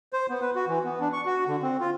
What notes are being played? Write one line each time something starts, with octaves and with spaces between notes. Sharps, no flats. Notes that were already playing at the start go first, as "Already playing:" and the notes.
C5
B3
B4
F#4
E3
B3
D4
C#6
F#4
D3
C4
F4